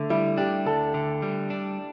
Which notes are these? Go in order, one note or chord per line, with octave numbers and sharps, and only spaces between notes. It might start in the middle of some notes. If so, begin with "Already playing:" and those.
Already playing: D3 A3
G3 E4
D4 G4
D2 A4
D3
G3
D4